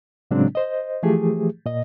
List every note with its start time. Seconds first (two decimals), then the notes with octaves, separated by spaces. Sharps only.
0.31 A2 C#3 F#3 G#3 C4 D4
0.55 C5 D#5
1.03 E3 F3 A3 G4 G#4
1.66 A#2 D#5